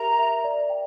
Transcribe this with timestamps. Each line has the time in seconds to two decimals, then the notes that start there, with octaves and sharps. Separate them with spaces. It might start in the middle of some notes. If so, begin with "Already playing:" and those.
Already playing: G4 A#4 E5 A#5
0.19 E5
0.44 D5
0.70 G5